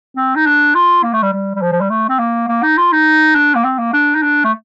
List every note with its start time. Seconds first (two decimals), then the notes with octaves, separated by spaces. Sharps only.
0.16 C4
0.36 D#4
0.46 D4
0.75 F4
1.03 A#3
1.13 A3
1.22 G3
1.33 G3
1.55 G3
1.62 F3
1.72 F3
1.81 G3
1.90 A3
2.09 C4
2.19 A#3
2.48 A#3
2.63 D#4
2.77 F4
2.92 D#4
3.35 D4
3.55 A#3
3.64 C4
3.79 A#3
3.93 D4
4.15 D#4
4.22 D4
4.44 A3